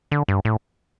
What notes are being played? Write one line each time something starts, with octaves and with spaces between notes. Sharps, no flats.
D3
G2
A2